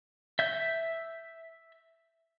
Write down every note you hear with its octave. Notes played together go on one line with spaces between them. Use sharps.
E5 G6